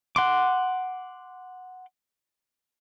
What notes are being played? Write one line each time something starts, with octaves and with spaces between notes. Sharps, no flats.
F#5 C6 D6